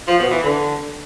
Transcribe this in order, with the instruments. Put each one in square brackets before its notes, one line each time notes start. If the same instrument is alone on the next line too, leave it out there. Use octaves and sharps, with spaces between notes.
[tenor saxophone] F3
B2
E3
D3